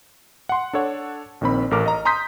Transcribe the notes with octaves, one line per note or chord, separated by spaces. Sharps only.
F#5 C6
D4 A4 C#5 F#5
A#1 D#3 C4 B5
A1 A4 A#4 D6 F6
D#5 A#5
A#5 C6 D#6 G6 B6